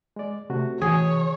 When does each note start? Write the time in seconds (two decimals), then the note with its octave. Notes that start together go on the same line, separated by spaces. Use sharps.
0.16 G#3 D5
0.50 C3 A3 F#4
0.82 E3 G#4 C#5